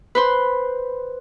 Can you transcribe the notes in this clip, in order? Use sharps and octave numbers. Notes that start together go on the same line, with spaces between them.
B4 C5 C6